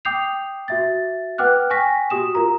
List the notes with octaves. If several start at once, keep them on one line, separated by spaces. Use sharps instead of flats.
G5 D6 D#6 G6 C7 F7
F#4 E5 A6
B4 F#5 G5 D6 F6 F#6
G5 G#5 C#6 A#6 B6
F#4 G4 D#6 E7
F4 A#4 A#5